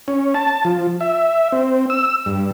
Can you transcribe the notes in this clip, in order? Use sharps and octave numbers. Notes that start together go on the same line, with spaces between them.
C#4
A5
F3
E5
C4
E6
G2